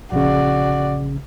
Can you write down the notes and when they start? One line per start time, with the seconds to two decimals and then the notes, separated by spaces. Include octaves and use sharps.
0.12 A#1 C#3 F#4 D5